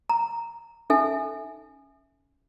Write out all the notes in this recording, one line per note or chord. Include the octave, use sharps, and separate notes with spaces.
A#5
C#4 D#4 A4 E5 G#5